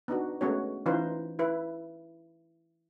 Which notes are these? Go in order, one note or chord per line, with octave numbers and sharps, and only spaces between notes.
B3 D4 D#4 F#4
G#3 A3 B3 C#4 F#4 C#5
E3 C#4 D#4 F4 B4 C5
E4 B4